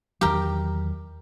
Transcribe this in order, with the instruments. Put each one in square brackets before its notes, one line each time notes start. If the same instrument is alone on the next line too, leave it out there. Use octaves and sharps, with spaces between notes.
[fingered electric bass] E2 D#3 F#3 [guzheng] G4 A#4